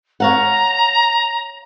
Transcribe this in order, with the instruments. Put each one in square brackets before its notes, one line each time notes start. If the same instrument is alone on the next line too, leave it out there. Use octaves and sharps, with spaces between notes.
[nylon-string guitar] C#5 F5 F#5 [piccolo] A#5